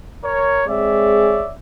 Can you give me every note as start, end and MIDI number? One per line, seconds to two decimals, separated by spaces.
0.24 0.63 70
0.24 0.63 73
0.68 1.40 56
0.68 1.40 60
0.68 1.40 68
0.68 1.53 73
0.68 1.53 74
0.68 1.53 76